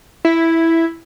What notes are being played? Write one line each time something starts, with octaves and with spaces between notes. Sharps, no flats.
E4